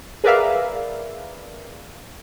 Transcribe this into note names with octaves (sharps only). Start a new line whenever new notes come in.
G#4 A#4 B4 D5 E5 F5